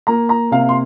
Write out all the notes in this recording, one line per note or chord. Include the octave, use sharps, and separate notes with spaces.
A#3 A#5
A#5
C3 F5
C6